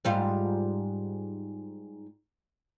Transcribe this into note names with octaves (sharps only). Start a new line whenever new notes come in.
G#2 G3 F4